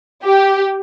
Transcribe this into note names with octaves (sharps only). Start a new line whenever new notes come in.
G4